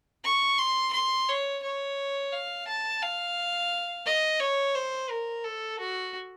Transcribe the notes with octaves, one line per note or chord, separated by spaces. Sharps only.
C#6
C6
C6
C#5
C#5
F5
A5
F5
D#5
C#5
C5
A#4
A4
F#4